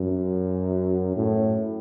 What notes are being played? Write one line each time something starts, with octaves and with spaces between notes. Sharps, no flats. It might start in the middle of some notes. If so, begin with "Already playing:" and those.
Already playing: F#2
A2